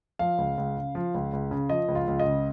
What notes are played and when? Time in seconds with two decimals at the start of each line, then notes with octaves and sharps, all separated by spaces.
0.19 F3 F5
0.38 C#2
0.58 C#2
0.77 C#3
0.95 F3
1.14 C#2
1.33 C#2
1.51 C#3
1.69 F3 D#5
1.88 C#2
1.95 F4
2.07 C#2
2.20 D#5
2.26 C#3